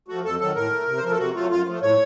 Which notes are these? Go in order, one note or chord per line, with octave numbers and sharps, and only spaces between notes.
F3 A3 F#4
F2 A4
D#3 F#3 A4
A2 A#4
A3
C3
C5
F3 A3 A#4
A4
C3 F#4
F#3 A3 F4
F#2 F4
F3 A3
A2 C#5